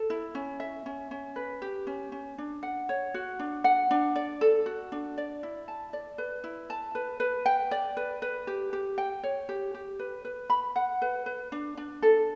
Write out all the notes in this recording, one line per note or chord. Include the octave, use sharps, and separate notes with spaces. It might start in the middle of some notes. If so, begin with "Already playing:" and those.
Already playing: A4
E4
C#4
E5
C#4
C#4
B4
G4
C#4
C#4
D4
F#5
C#5
F#4
D4
F#5
D4
D5
A4
F#4
D4
D5
E4
A5
D5
B4
E4
A5
B4
B4
G5
D5
B4
B4
G4
G4
G5
C#5
G4
G4
B4
B4
B5
F#5
B4
B4
D4
D4
A4